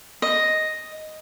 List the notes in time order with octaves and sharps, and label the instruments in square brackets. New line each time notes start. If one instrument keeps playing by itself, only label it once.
[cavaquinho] D#5